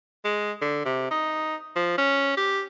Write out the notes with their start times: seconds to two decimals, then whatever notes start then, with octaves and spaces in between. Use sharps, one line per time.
0.24 G#3
0.62 D3
0.85 C3
1.11 D#4
1.76 F3
1.98 C#4
2.37 G4